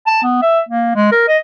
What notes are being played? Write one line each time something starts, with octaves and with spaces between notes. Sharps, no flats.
A5
B3
E5
A#3
G#3
A#4
D#5